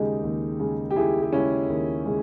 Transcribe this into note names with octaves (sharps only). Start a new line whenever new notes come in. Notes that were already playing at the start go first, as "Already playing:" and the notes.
Already playing: D#2 C#3 G#3 D#4 G4
D#2
C#3 G#3
G4
D#2 E4 G#4
G4
C#3 G#3 C#4 E4
D#2
C#3 G#3